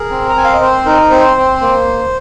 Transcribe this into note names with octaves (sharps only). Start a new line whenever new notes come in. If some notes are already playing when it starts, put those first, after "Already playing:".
Already playing: G#4 A#4
C4
A#5
C4 G#5
F5
D#5
C4 C5
D#4 A#4
C4 C5
C4
A#3